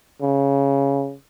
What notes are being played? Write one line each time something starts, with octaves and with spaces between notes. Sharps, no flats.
C#3